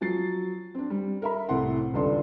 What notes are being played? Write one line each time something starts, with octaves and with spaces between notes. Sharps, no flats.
F3 F#3 A6 C7
C4 D4
G3
A#4 E5 B5
C2 A2 C4 A4 F#5 C6
D#1 C#2 G2 A4 D5 C6